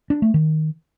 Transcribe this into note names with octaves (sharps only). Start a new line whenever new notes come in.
D4
A3
D#3